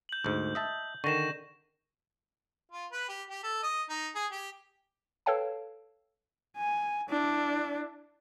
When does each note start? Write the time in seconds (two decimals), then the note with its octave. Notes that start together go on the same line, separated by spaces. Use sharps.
0.09 G6 F#7
0.24 D2 G#2
0.55 D#5 E5 A5
1.04 D3 D#3 C#6 A#6 E7
2.72 F4
2.92 B4
3.09 G4
3.30 G4
3.43 A4
3.63 D#5
3.89 D#4
4.15 G#4
4.32 G4
5.26 A4 B4 C#5 F5 G5 A5
6.57 G#5
7.10 D4 E4